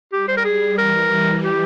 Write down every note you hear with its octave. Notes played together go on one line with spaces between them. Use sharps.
G3 G4
C5
A#4
G#4
E3 A#4
G4